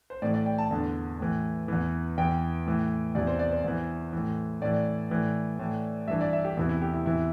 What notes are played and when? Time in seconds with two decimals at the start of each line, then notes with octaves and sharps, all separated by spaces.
0.10 C5
0.22 A2 E3 D5
0.34 D5
0.46 G5
0.58 A5
0.71 E2 D3
1.20 A2 E3
1.68 E2 E3
2.18 E2 E3 G5
2.66 A2 E3
3.15 E2 C3 E3 D5
3.27 C5
3.39 D5
3.51 C5
3.64 E2 E3
4.13 A2 E3
4.61 A2 E3 D5
5.10 A2 E3
5.59 A2 E3
6.08 G2 E3 E5
6.21 D5
6.33 E5
6.45 G4
6.57 E2 C3 E3 E4
6.69 E4
6.82 G4
6.94 E4
7.05 E2 C3 E3 E4